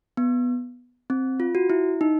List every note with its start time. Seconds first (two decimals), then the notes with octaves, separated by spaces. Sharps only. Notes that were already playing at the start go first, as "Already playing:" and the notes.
0.17 B3
1.10 C4
1.40 F4
1.55 F#4
1.70 E4
2.01 D#4